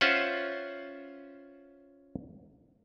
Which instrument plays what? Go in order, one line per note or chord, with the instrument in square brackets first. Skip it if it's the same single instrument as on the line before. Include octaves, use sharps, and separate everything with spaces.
[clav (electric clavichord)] C#4 F4 C5 E5 F#5